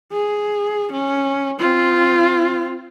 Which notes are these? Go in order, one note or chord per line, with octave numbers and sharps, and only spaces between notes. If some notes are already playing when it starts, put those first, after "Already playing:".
G#4
C#4
C4 F4